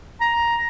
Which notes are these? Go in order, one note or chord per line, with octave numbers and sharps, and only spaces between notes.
A#5